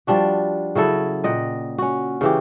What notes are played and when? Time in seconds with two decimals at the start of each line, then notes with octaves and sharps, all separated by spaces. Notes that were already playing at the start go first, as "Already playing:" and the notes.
0.07 F3 G3 D4 F#4
0.75 C#3 F#3 E4 A4
1.24 A#2 D#5 F#5 G5
1.78 C#4 F#4
2.21 C#3 E3 G4